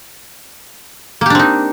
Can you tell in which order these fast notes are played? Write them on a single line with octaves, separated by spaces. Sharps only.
A#3 G4 D4 C4 D#4